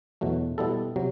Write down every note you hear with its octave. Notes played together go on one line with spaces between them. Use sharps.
E2 B2 F#3 A3
B2 G3 B3 E4 A4
C3 F#3